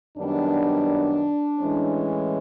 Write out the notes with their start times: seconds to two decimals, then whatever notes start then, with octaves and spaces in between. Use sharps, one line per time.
0.17 F#2 D#3 G3 B3 D4
1.60 A2 E3 G#3 C#4